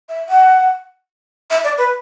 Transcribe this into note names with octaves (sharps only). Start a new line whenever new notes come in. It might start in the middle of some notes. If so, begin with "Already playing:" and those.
E5
F#5
E5
D5
B4